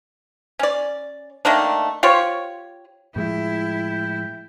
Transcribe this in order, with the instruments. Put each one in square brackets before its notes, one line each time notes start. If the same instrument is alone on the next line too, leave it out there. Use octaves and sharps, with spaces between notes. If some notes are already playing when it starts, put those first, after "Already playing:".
[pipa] C#4 D5
D#3 A3 A#3 D4
F4 G4 C5 C#5
[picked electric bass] A2 F3 G#3 [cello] E4 [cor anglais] G5